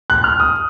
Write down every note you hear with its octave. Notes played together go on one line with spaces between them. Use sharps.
F#6
F6
D#6